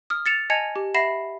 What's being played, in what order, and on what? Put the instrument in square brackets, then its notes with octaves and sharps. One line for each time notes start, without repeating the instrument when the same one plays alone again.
[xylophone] D#6 F6
A6 C#7 E7 F7
D#5 G#5 A5 G#6 C#7 F7
G4
E5 F#5 B5 A#6 C7 E7